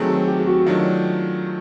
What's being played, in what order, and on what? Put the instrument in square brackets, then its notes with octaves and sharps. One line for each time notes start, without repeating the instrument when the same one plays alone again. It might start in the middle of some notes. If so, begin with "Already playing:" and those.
Already playing: [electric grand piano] D#3 F#3 A3 C4 [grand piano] G#4
[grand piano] G4
G4
G4
F#4
[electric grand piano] D#3 F#3 A3 D4 [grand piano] F4